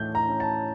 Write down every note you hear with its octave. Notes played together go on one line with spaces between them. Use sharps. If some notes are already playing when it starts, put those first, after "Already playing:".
Already playing: A2 E3 A3 G6
A#5
C#4
A5